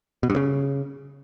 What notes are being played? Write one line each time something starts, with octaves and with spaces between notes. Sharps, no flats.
B2
G2
C#3